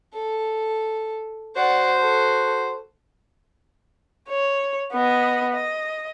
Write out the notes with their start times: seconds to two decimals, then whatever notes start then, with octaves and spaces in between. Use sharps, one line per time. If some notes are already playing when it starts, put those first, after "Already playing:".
0.14 A4
1.56 F#4 C5 D5 F#5
1.98 A4
4.29 C#5
4.93 B3 D#5
5.53 D#5